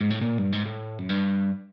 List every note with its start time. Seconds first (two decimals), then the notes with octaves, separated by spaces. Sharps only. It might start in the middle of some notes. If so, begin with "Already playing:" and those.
0.01 G#2
0.11 A2
0.21 A#2
0.38 G2
0.52 G#2
0.65 A2
0.99 F#2
1.09 G2